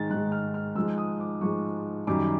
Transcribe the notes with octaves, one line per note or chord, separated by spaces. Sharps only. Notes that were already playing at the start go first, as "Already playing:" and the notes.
Already playing: G#2 D#3 G#3 A6
G#2 D#3 G#3 F#6
F6
F6
G#2 F3 G#3 E6
D#6
D6
G#2 F3 G#3 C#6
F#2 D#3 G3 D6